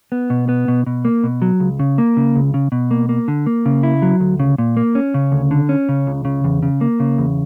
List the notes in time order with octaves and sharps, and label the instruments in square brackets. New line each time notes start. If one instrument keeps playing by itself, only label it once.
[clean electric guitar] B3
B2
B3
B2
B2
A#3
B2
F#3
C#2
C#3
A#3
C#3
C#2
C#3
B2
A#3
A#3
D3
A#3
C#3
E4
F#3
D2
C#3
A#2
A#3
C#4
C#3
D2
D3
C#4
C#3
C#2
C#3
E2
C#3
A#3
C#3
E2